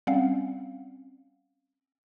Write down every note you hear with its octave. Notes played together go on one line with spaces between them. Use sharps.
G3 C4 C#4 F5 F#5